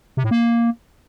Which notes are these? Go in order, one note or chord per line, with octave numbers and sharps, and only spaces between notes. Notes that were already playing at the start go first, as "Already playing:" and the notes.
C3
A2
A#3